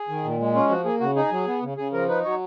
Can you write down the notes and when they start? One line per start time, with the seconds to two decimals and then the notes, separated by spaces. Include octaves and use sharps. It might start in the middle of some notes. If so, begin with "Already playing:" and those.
Already playing: G#4
0.09 D#3
0.24 A#2
0.39 G#3
0.55 C#4 F4
0.69 F3 F#4
0.85 A#3 G#4
1.00 C#3 F#4
1.16 D#4 G#4
1.32 F#3
1.47 B3
1.62 C#3
1.77 C#3 G#4
1.93 F3 A#4
2.08 D#4 B4
2.24 F#3 C#5